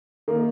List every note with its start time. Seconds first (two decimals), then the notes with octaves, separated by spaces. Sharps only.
0.28 D#3 A#3